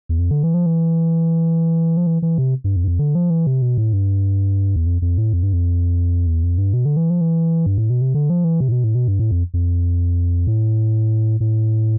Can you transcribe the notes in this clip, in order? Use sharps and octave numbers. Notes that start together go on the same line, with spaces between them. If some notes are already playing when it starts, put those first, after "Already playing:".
E2
F2
D3
E3
F3
E3
F3
E3
E3
C3
G2
F2
G2
F2
D3
F3
E3
C3
B2
A2
G2
E2
F2
F2
A2
F2
G2
F2
E2
F2
G2
B2
D3
E3
F3
E3
G2
A2
B2
C3
D3
F3
E3
C3
A2
B2
A2
B2
G2
A2
F2
F2
A2
A2